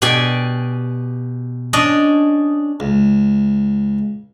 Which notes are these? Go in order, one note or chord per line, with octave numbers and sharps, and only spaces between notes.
B2 G4 D5 G#5
C#4 D4 D5 D#5
C#2